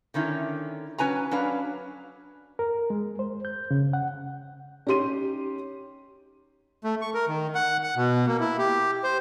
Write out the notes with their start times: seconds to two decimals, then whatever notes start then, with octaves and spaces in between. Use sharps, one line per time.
0.14 D3 D#3 C#4 E4
0.98 F#3 C#4 B4 G#5 A#5
1.31 F#3 C#4 D4 B4 F5
2.59 A#4
2.90 G#3
3.19 C5
3.45 G6
3.71 C#3
3.93 F#5
4.87 C#4 D#4 G4 C6 D#7
6.84 A3
7.01 C#6
7.14 A#4
7.28 D#3
7.55 F#5
7.83 F#5
7.96 B2
8.27 A#3
8.40 E4
8.58 G4
9.04 C5